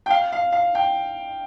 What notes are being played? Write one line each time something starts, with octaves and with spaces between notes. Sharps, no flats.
G5
F5
F5
F5
G5